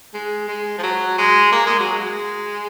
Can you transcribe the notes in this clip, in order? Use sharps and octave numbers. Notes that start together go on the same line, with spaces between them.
G#3
G#3
F3
F#3
G#3
A#3
G#3
F#3
G#3